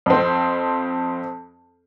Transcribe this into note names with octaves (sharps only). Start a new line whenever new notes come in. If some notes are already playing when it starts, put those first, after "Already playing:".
F2 C4